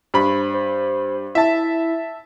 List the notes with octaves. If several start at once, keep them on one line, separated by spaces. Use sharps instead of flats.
G2 C5 B5
C5
E4 E5 A5